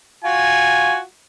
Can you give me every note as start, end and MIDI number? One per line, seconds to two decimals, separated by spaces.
0.24 1.01 65
0.24 1.01 66
0.24 1.00 80